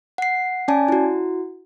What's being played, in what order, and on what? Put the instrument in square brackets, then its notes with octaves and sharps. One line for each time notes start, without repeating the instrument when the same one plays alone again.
[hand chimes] F#5 C7
C#4 D5 G#5 A5
E4 F#4